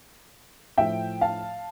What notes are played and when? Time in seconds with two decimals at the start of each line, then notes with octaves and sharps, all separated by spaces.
0.78 A2 F3 E5 G5
1.21 F5 A5